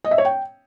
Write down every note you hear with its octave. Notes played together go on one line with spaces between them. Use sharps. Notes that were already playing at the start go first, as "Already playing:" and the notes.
D#5
E5
C#5
G5